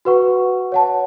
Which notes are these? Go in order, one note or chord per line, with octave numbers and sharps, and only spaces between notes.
F#4 B4 F#5 C#6
C#5 F#5 A5